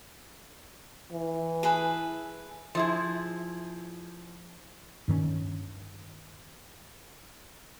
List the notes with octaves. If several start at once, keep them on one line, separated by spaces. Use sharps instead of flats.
E3
G#4 A4 B4
F3 E4 G#4
G2 D#3 C4 C#4